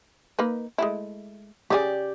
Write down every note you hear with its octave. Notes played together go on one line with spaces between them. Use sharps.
A#3 D#4 B4
G#3 A3 E4
C#3 D#4 G4 G#4 D5